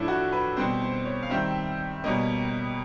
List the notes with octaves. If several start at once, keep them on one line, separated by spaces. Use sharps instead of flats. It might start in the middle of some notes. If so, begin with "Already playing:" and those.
Already playing: A2 F3 A3 D4 E4
F#4
B4
B2 G3 C4 C5
C5
C#5
F5
D#3 G3 C4 E5
B2 G3 A#3 C#4 D#5